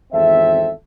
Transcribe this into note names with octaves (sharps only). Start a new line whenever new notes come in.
G#1 E2 C4 A4 E5